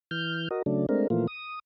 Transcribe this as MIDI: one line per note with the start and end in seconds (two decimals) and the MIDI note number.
0.11 0.48 52
0.11 0.48 89
0.11 0.48 91
0.51 0.62 66
0.51 0.62 70
0.51 0.62 75
0.66 0.86 49
0.66 0.86 54
0.66 0.86 57
0.66 0.86 62
0.89 1.07 56
0.89 1.07 57
0.89 1.07 60
0.89 1.07 62
0.89 1.07 70
1.10 1.27 46
1.10 1.27 52
1.10 1.27 53
1.10 1.27 57
1.10 1.27 58
1.10 1.27 65
1.27 1.59 87